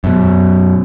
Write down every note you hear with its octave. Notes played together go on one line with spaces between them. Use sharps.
F#2 B2